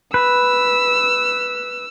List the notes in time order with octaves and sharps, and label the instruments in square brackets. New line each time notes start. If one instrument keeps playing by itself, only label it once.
[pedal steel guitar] B4 [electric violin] E6